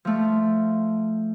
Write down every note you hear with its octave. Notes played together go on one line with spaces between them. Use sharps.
F3 A3